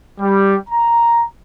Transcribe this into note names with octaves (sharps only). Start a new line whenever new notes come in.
G3
A#5